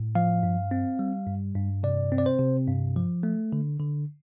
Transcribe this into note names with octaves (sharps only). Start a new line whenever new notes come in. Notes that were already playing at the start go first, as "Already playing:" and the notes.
Already playing: A2
F3 F5
G2
C4
G3
G2
G2
C3 D5
C4
D5
C5
C3
G2
F3
A3
D3
D3